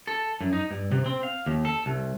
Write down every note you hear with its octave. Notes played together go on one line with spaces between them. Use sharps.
A4
F#2
D#4
G2
C3
C4
F5
D#2
A4
C2